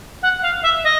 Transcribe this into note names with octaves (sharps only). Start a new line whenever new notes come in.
F#5
F5
E5
D#5